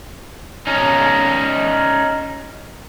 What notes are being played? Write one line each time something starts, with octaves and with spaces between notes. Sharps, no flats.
C#4 D#4